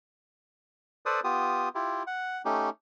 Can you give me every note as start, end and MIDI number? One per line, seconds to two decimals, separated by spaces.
1.06 1.20 69
1.06 1.20 71
1.06 1.20 72
1.06 1.20 74
1.06 1.20 87
1.24 1.69 59
1.24 1.69 65
1.24 1.69 67
1.24 1.69 87
1.75 2.03 64
1.75 2.03 65
1.75 2.03 67
2.07 2.42 78
2.45 2.70 57
2.45 2.70 61
2.45 2.70 63
2.45 2.70 67